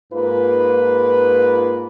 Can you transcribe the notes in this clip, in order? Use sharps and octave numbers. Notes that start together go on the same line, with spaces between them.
G#2 A#3 F4 B4